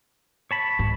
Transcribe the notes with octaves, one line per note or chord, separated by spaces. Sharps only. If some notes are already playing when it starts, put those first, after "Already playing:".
C#5 A5 B5
G#2